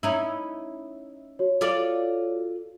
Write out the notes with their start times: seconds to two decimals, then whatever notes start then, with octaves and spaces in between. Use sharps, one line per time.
0.03 C#4 D#4 E4
1.39 F#4 C#5
1.61 F4 A4 D5